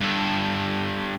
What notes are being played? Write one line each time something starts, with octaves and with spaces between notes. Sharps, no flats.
G2 A4